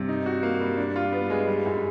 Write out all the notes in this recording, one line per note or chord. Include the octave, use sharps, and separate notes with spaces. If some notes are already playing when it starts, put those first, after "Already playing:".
Already playing: G2 C3
D#4
F#4
A#3
G3
D4
F4
B3
G#3
G3
F#2